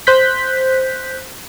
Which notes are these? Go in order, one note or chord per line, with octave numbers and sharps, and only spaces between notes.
C5 F#6 G6 B6